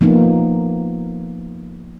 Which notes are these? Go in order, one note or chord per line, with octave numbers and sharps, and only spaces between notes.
F3 A#3 B3 D#4